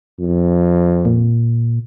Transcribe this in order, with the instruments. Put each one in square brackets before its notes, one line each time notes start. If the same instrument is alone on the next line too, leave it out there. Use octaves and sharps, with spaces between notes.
[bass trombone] F2
[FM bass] A#2